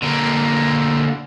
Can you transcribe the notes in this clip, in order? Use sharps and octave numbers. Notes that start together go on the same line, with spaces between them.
D3 A#3